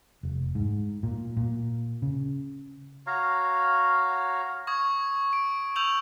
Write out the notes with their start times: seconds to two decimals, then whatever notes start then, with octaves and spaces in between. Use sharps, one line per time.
0.23 F1
0.55 G#2
1.03 A#2
1.37 A#2
2.02 C#3
3.07 F#4 C#5 F5 A#5
4.67 C#6 D#6 G#6
5.33 D7
5.76 C#6 E6 G6 F7 F#7